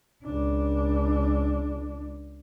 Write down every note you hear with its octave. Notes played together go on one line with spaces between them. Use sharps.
C#2 D4